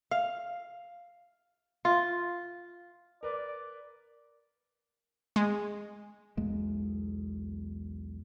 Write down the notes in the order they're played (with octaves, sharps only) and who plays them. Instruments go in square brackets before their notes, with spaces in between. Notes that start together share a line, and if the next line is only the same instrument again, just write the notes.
[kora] F5
F4
[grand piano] A#4 B4 [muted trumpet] D5
[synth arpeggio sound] G#3
[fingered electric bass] B1 E2 G#3 A#3